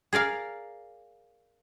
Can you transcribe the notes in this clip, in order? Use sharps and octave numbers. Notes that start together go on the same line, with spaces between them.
G#4 A#4 D5 F5